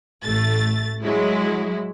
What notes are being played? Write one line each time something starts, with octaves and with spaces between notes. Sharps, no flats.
A1 A3 A6
F#3 G#3 E4